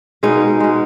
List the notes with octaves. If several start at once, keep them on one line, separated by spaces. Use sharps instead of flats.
B2 G#3 D#4
B2 G#3